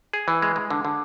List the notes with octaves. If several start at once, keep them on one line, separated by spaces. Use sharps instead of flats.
G#4
E3
G#3
G#3
D3
D3